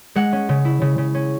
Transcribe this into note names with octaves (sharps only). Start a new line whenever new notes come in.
G#3 F#5
C#4
C#3
E4
C#3
C#3
C#4